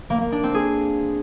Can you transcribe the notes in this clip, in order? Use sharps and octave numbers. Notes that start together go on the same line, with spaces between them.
A#3
A#3
D4
C4
G#4